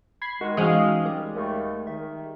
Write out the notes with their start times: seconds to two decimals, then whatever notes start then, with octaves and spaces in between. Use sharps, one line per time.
0.22 B5 G#6 C7
0.41 D#3 G#3 F#4
0.57 E3 G#3 C4 C#4 D#4 F#4 F5 D#6
1.05 G3 A#4
1.35 D#2 A3
1.87 D#3 E5